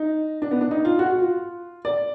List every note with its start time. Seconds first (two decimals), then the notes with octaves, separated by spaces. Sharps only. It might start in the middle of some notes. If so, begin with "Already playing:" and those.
Already playing: D#4
0.42 D4
0.51 B3
0.61 D4
0.71 D#4
0.85 F4
0.99 F#4
1.09 F#4
1.19 F4
1.85 D5